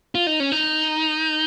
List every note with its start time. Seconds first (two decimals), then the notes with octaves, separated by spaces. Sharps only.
0.15 F4
0.27 D#4
0.40 C#4
0.52 D#4